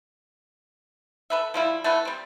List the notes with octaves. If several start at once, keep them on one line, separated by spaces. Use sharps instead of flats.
A4 B4 E5
F3 G3 E4
A3 E4 B4 F#5
G3 C4